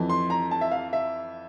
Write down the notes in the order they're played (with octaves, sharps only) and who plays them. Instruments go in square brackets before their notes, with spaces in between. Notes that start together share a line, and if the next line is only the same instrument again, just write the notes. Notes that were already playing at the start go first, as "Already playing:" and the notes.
Already playing: [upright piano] F2 E3
C6
A#5
A5
E5
F5
E5